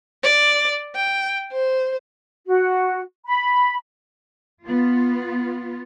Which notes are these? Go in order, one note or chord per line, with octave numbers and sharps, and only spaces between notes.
D5
G5
C5
F#4
B5
B3 F4